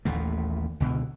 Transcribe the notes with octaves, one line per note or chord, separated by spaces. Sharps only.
A1 D#2 A#2 A3
C#2 B2 D3